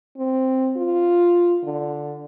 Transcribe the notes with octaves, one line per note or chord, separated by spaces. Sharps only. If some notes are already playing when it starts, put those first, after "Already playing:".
C4
F4
D3